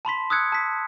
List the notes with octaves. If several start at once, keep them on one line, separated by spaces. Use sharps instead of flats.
A5 B5 C6 B6
D#6 E6 F#6 G#6 C#7
A5 B6